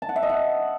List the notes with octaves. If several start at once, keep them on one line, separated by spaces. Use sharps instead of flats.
A5
F#5
E5
D#5
F#5